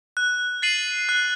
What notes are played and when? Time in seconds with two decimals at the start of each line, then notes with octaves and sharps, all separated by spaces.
0.17 F#6
0.62 A6 C7 D#7 F#7
1.09 F#6